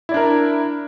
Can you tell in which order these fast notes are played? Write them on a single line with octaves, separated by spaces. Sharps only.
E4 D5 D4 A#4